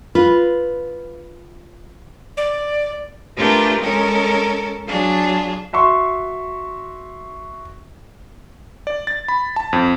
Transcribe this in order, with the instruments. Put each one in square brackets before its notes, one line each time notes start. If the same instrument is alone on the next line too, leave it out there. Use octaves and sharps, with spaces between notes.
[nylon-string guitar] F4 B4
[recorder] D5
[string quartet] A3 D4 F4 G4 A#4 B4
G#3 C#4 A4 A#4
F#3 D4 F4 G#4
[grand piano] F#4 E5 C6 C#6
[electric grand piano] D5
A6
B5
A5
F2